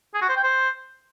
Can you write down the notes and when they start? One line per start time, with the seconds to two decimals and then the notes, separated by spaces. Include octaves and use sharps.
0.14 G#4
0.22 F#4
0.29 C5
0.36 G5
0.44 C5